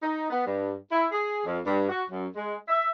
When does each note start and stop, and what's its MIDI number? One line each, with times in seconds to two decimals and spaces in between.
0.02 0.30 63
0.30 0.45 59
0.46 0.74 43
0.92 1.06 64
1.12 1.41 68
1.45 1.59 41
1.65 1.86 43
1.89 2.02 66
2.09 2.26 42
2.35 2.55 56
2.68 2.90 76